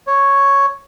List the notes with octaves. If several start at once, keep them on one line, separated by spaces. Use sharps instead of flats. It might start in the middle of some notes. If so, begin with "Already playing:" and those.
C#5